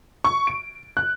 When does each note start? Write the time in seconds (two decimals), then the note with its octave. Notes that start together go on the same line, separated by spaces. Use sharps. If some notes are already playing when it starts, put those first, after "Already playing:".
0.24 C#6
0.47 D7
0.97 F#6